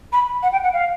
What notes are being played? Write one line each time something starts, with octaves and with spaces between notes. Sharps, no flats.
B5
F#5
G5
F#5
F5